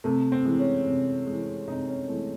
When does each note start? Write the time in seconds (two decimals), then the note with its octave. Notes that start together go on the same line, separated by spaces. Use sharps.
0.04 C3 A3
0.32 C4
0.45 E3 G#3
0.59 C#4
0.86 C3
1.27 E3 G#3
1.68 C3 D#4
1.87 C#4
2.08 E3 G#3 A3